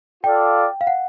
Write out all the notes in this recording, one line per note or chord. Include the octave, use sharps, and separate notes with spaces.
F4 A4 D5 F5 G5
F5
F#5